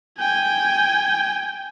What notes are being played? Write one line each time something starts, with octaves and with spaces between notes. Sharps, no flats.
G5 G#5